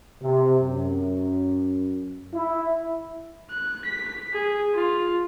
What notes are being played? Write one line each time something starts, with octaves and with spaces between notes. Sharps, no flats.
C3
F#2
E4
F#6
B6
G#4
F4